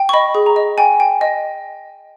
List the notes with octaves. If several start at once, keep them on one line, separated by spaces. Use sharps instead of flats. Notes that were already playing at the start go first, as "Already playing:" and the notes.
Already playing: G5
C#6
D#5 B5
G#4
A#5
D#5
G5 G#5
G5
D#5